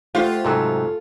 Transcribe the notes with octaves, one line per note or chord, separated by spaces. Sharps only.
A3 F4 G4 C5 F#5
G#2 C3 F#3 A4